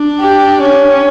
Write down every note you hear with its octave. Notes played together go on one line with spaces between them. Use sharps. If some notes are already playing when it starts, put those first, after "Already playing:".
Already playing: D4
G4
C#4